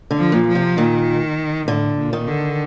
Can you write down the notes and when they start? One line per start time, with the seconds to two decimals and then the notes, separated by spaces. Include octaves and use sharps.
0.11 D3
0.18 F3
0.32 A#2
0.48 F3
0.55 C3
0.78 A#2 D#3
1.68 A2 D3
1.98 A#2
2.13 D#3
2.27 D3